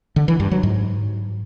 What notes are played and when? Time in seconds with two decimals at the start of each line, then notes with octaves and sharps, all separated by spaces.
0.16 D3
0.28 E3
0.40 G2
0.51 F#3
0.63 G#2